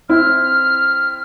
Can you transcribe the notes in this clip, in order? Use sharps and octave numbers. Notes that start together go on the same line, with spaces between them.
C4 E4 F6